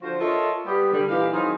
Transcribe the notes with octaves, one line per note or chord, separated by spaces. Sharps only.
D3 F3 F#4 C5
F4 A4 A#4 C#5 D#5 E5
G3 B3 G4
D3 G3
A#2 E3 D#4 G4 F5
D#3 F#3 C4 D#4 E4 G#4